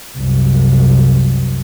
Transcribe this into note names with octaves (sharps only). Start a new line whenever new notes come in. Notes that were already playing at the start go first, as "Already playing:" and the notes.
C2 F#2